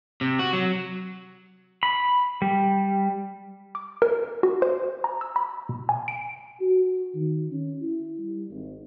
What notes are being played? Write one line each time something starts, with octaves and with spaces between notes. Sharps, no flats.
C3
F#4
F#3
B5
G3
D6
A#4
F#4
C5
A#5
E6
B5
B2
G#5
D7
F#4
D#3
C#4
E4
G3
G#1